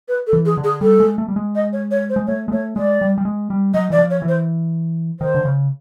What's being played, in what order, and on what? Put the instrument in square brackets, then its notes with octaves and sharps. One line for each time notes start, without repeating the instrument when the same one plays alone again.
[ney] B4
A4
[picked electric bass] E3
[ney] G#4
[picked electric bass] D3
[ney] G#4
[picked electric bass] G3 [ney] A4
[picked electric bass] G#3
A3
G3
G#3
[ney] D#5
C#5
C#5
C5
[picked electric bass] G#3
[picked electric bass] A3 [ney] C#5
[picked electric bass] G#3
[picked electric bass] A3 [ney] C#5
[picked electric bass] G#3 [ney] D5
[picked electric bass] G3
G3
G#3
G3
[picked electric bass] F#3 [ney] D#5
[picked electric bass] E3 [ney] D5
[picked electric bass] F3
[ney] C#5
[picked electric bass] E3
[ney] C5
[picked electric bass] D#3 [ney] C5
[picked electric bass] D3
C#3